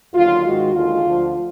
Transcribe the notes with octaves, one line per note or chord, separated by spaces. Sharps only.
D#2 D3 F#3 F4
G#2 D#3 G#3 F#4
D#2 D3 G#3 F4
D2 D3 F3